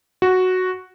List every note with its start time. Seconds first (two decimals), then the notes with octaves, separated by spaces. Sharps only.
0.22 F#4